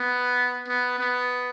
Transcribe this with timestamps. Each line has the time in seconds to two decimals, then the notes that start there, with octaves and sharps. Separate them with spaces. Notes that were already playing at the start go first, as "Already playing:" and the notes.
Already playing: B3
0.68 B3
0.99 B3